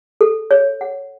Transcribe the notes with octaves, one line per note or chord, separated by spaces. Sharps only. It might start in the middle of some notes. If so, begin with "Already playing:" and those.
A4
C#5
F#5